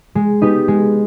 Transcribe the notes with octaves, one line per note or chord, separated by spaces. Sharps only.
G#3
B3 D#4 G4 B4
G#3